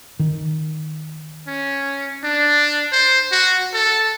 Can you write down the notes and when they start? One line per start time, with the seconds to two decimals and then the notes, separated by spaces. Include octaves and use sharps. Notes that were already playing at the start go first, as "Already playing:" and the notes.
0.19 D#3
1.47 C#4
2.24 D4
2.92 C5
3.32 F#4
3.74 A4